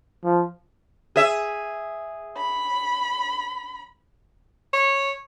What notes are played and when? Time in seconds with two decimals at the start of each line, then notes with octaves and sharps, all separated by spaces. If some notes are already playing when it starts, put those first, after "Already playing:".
0.24 F3
1.16 G#4 E5
2.37 B5
4.73 C#5